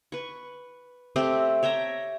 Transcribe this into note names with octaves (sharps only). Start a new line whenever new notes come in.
B4 C#6
A3 C4 G4 C5
C#5 E5 G5 A#5